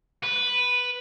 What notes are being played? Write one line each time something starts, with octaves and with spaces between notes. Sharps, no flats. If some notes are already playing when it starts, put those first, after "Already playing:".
B4